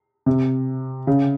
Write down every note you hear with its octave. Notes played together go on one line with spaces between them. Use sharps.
C3
C#3